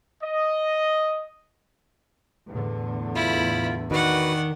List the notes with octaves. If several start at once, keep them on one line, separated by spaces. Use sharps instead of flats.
D#5
E2 A2 D3
E4 F4 B5
D#3 F#4 B4 D5 F#5